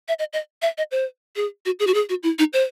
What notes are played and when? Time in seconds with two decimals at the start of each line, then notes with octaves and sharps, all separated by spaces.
0.08 E5
0.19 D#5
0.33 D#5
0.62 E5
0.78 D#5
0.91 C5
1.36 G#4
1.66 F#4
1.79 G#4
1.87 F#4
1.94 G#4
2.09 F#4
2.23 E4
2.39 D#4
2.53 C5